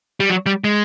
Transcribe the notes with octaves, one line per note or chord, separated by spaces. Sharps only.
G3
F#3
G3
G#3